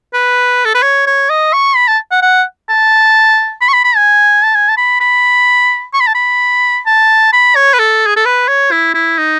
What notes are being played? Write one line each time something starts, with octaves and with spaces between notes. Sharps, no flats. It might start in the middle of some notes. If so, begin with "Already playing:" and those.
B4
A4
B4
C#5
C#5
D#5
C#6
B5
A5
F#5
F#5
A5
B5
C#6
B5
B5
G#5
A5
G#5
A5
B5
B5
C#6
B5
A5
B5
A5
B5
C#5
B4
A4
G#4
A4
B4
C#5
E4
E4
D#4